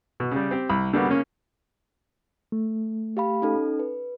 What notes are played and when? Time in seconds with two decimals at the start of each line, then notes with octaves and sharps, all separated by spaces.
0.20 B2
0.32 C#3 G3
0.51 C4 G4
0.69 C2 B5
0.93 D3 G3 A#3 B3 F#4
1.06 C#3 A#3 C#4
2.52 A3
3.17 G4 F5 B5
3.42 C#4 D#4 A4
3.80 B4